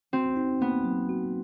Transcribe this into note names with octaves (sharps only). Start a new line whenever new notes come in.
C4 F#4
D#4
A#3 B3
F#3
F#4